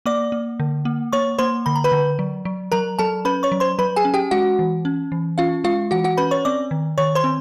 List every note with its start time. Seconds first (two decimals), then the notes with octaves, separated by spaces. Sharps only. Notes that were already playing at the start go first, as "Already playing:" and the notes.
0.06 A#3 D5 D6
0.32 A#3
0.60 D3
0.85 A#3
1.13 A#3 C#5 C#6
1.39 A#3 C5 C6
1.66 D3 B5
1.75 A#5
1.84 B4 B5
1.92 D3
2.19 F#3
2.45 F#3
2.72 F#3 A#4 A#5
2.99 F#3 A4 A5
3.25 C#4 B4 B5
3.43 C#5 C#6
3.52 F#3
3.60 C5 C6
3.78 F#3 B4 B5
3.96 G#4 G#5
4.05 C#4
4.14 G4 G5
4.31 G#3 F#4 F#5
4.59 E3
4.85 C#4
5.12 E3
5.38 C#4 F4 F5
5.64 G#3 F4 F5
5.91 E3 F#4 F#5
6.04 F#4 F#5
6.17 C#4 B4 B5
6.31 C#5 C#6
6.45 C4 D5 D6
6.71 D#3
6.98 D#3 C#5 C#6
7.15 C5 C6
7.24 C4